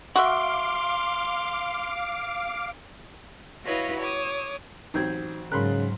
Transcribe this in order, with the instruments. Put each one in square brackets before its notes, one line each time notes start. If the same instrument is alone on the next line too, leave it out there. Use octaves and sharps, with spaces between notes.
[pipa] F#4 E5 [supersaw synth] F5 D6 [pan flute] C6
[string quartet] E4 F#4 B4 C#5 D#5 F5
C#5 D6 D#6
[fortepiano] A1 F#3 C4 [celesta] D#4 G6 G#6
[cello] G#2 F#3 [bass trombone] C#3 [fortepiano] A#4 B5 C6 [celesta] F#6